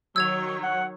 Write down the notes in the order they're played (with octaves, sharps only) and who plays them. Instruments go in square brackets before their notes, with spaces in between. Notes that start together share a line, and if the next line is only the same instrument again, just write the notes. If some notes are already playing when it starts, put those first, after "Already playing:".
[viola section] D#3 F#3 C#5 [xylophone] E6 G#6 F7
[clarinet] F#5